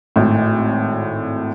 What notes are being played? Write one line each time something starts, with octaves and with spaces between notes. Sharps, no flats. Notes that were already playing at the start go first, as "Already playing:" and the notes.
G#1 A2